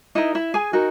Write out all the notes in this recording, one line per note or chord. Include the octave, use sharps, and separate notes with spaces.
D#4 E4 A#4 D#5
E4 E5
G#4 G#5
D#4 F#4 A#4